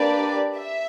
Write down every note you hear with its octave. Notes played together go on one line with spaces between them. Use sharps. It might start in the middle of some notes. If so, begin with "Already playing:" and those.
Already playing: A#3 D4 G4 B4 D5
E5